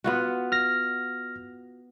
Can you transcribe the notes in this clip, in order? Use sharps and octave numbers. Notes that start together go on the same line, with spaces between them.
B3 F4 F#4
F6 A#6